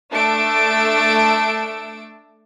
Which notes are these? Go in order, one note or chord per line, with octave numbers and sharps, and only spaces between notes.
A3 D4 A5 E6 D7